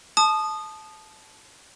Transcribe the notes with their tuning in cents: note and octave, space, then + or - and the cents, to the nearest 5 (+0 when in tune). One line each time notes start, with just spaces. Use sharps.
A5 -20 D#6 -20